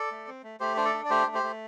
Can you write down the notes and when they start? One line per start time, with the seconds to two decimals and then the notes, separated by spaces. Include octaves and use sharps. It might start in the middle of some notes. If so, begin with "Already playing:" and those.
Already playing: A4 D5
0.11 A3
0.27 C4
0.44 A3
0.60 A3 G4 C5
0.77 D4 C5
0.84 A4 D5
0.94 D4
1.05 D5
1.10 A3 G4 C5
1.27 A3
1.34 G4 C5
1.43 A3